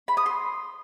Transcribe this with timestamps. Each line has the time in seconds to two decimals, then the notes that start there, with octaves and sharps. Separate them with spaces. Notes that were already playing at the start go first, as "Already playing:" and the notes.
0.08 B5
0.17 D#6
0.26 C6